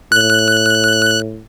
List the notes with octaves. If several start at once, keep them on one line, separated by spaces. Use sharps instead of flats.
A2 F#6